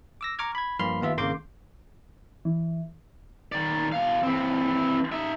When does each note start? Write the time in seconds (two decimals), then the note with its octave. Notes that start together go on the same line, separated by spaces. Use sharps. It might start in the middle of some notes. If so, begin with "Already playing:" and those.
0.21 D6 E6 A#6
0.39 A#5 C#6 D6 F6 G#6
0.55 B5 G#6
0.79 G2 F3 A#3 B5 C6 F6
1.01 D#2 B3 F4 E5
1.17 G#1 C#3 A#3 C6 D6 G6
2.45 E3
3.52 D#3 D5
3.92 B2 F5
4.23 E3 C4
5.12 D#4 E5